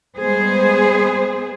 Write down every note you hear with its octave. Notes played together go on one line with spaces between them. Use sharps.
G3 G#3 B3 G#4 C5